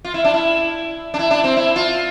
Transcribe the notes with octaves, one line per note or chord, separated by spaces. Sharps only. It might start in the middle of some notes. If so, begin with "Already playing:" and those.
F4
E4
D4
E4
D4
E4
D4
C4
E4
F4